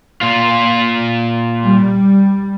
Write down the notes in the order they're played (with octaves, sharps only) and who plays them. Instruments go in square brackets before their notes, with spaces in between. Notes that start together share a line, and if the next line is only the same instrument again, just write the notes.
[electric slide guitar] A#2 F4
[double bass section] G3